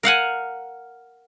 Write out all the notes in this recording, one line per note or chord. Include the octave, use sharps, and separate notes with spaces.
A#4 F5 F#5 G#5